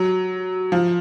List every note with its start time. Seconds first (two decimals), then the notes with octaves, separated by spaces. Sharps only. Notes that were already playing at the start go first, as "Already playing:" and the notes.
Already playing: F#3
0.72 F3